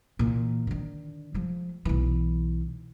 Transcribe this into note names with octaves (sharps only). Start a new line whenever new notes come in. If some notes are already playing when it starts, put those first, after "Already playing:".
A#2 E3
D3 D#3
F3 G#3
B1 E3